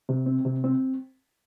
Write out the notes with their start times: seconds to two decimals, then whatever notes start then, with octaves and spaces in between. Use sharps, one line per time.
0.09 C3
0.26 C4
0.45 C3
0.64 C4